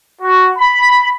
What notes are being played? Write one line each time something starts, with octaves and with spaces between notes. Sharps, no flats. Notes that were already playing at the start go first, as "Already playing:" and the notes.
F#4
B5